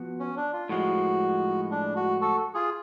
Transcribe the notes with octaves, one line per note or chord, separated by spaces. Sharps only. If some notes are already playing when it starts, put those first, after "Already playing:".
Already playing: F3 B3 F#4
C#4
D4
F4
A2 F3 G#3 F#4
D4
F#4
F#4 A4
F4 G#4